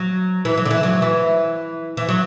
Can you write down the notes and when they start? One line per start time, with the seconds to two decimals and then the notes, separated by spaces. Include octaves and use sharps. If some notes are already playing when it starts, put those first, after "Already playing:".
Already playing: F#3
0.45 E3
0.57 F#3
0.65 D3
0.71 E3
0.83 F#3
1.02 E3
1.97 E3
2.09 F#3